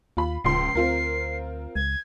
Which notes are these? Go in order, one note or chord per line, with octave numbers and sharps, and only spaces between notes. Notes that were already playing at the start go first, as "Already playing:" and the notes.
D#2 F4 B5
D1 C#2 F3 C6 C7
D2 C4 F4 A#4
C#2 G#6